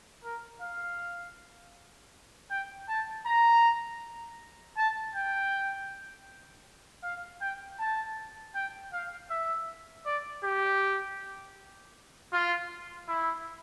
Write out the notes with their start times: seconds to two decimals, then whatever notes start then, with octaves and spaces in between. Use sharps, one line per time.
0.24 A#4
0.61 F5
2.50 G5
2.88 A5
3.26 A#5
4.77 A5
5.15 G5
7.03 F5
7.41 G5
7.79 A5
8.54 G5
8.92 F5
9.30 E5
10.06 D5
10.44 G4
12.33 F4
13.08 E4